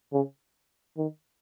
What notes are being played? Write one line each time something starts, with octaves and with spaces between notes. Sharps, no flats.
C#3
D#3